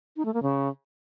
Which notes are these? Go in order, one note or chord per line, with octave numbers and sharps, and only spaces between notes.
D#4
A3
A#3
C#3